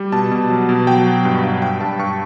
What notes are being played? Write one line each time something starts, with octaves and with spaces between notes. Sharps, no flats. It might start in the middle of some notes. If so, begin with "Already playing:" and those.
Already playing: G3
B2 A5
B2
F#3
B2
F#3 G5
F#3
G2
G2
G2 G5
G2 A5
G2 C#6